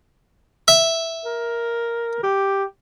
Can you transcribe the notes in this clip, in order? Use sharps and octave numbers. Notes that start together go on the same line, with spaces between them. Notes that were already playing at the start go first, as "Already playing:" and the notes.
E5
A#4
G4